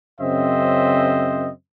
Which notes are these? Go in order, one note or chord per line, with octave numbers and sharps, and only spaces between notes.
F#2 C#3 C4 C5 D#5 E5